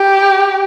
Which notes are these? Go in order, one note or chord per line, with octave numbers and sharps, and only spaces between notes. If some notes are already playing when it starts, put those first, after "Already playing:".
Already playing: G4